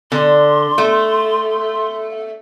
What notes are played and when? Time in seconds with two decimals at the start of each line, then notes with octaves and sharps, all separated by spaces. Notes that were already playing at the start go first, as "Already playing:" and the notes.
0.12 D3 C6
0.78 A3